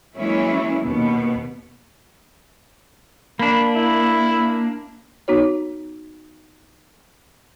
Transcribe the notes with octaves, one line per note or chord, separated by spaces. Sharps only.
E3 F#3 G#3 A#3 C#4 E4
D#2 B2 B3
A#3 D4 B5
E4
B3 D#4 F#4 C#5